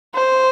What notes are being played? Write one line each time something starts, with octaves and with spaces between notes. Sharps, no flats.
C5